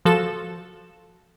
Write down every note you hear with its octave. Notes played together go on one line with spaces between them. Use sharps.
F3 F#4 A4 E7